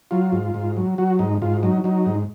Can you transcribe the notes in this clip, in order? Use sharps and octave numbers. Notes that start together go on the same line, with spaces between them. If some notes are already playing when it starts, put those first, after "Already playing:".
F#3 F4
G#2
G#2
F#3
F#3 F#4
G#2 D#4
G#2 F4
F#3 D#4
F#3 D#4
G#2